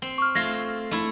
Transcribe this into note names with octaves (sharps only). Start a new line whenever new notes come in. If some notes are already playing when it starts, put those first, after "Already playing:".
C4
C#6 F6
A3 F4 G#6 A#6 C7
A3 E4